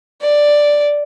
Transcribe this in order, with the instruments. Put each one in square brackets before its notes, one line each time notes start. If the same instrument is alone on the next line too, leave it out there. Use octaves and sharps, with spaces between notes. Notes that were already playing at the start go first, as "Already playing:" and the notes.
[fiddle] D5